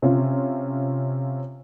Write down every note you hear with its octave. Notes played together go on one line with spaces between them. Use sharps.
C3 C#4 F4